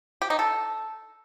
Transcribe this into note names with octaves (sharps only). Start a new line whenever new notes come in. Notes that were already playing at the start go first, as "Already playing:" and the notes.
G4
D#4
A4